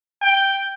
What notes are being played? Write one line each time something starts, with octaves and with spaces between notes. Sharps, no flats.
G5